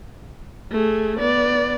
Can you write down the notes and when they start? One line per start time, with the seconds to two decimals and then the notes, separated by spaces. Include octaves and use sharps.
0.71 A3 G#4
1.19 B3 D5